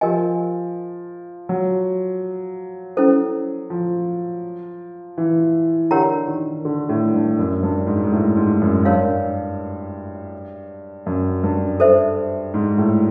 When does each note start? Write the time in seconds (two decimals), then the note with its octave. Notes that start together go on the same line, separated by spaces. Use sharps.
0.01 F3 G4 A#4 D#5 G#5
1.49 F#3
2.97 C#4 E4 A4 C5
3.70 F3
5.18 E3
5.91 D3 G4 A#4 C#5 F#5 A#5
6.28 D#3
6.65 D3
6.89 A2
7.14 G2
7.39 F#2
7.63 G2
7.87 G#2
8.04 G#2
8.12 A2
8.37 G#2
8.61 F#2
8.85 G2 A#4 C#5 F5
11.06 F#2
11.43 G2
11.80 A4 C5 E5
12.54 G#2
12.78 A2